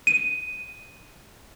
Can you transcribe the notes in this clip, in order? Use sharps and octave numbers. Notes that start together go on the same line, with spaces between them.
D#7